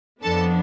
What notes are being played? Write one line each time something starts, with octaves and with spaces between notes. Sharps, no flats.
F2 F3 B3 D4 A4 A5